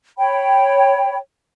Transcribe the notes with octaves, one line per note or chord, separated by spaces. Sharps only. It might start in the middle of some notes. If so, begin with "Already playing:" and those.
C#5 G5 B5